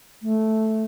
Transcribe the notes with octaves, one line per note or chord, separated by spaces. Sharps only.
A3